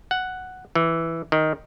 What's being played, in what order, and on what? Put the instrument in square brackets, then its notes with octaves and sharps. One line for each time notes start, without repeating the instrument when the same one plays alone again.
[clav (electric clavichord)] F#5
E3
D#3